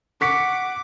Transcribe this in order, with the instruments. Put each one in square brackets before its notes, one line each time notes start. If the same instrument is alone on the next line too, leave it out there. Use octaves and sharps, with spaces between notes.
[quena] F#5 [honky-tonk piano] C#6 B6 C#7 [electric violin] D6